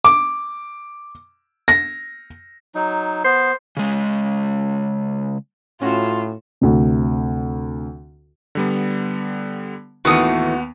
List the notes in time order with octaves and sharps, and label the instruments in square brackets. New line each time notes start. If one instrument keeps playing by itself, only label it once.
[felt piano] D6
A#6
[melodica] F#3 D#4
[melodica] B3 [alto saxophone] C5
[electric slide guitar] C#3 G#3
[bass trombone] A2 [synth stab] C#4 F#4 E7 [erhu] F4
[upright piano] D2 C3
[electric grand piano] D3 G3 B3
[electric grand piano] D#2 B3 [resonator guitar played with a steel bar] A2 D#3 E3 [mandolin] F#4 D#6